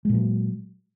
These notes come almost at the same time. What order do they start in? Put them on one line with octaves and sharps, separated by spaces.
G#3 A#2 F#3